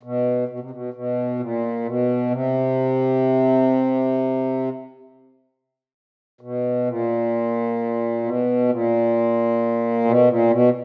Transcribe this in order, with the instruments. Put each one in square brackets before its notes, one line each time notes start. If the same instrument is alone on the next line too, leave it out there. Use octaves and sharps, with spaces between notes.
[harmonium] B2
B2
C3
B2
B2
A#2
B2
C3
B2
A#2
B2
A#2
B2
A#2
B2